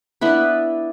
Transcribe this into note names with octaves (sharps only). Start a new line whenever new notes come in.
B3 D4 E4 B4